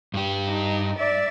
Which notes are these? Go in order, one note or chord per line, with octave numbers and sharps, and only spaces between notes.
G2 G4
D#4
D5 E5